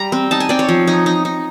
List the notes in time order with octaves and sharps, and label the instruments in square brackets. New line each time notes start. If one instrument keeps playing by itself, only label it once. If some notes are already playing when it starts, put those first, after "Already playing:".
Already playing: [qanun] G3 A#5
C4
D#4 A5
G#5
C4 D5
C#5
F3
D#4
D#4
D#4